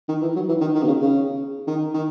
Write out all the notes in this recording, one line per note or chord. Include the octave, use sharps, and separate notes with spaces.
D#3
E3
F#3
E3
D#3
D#3
B2
C#3
C#3
D#3
D#3